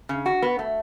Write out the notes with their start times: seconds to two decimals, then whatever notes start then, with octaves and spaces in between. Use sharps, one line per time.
0.09 C#3
0.26 F#4
0.42 B3
0.59 A3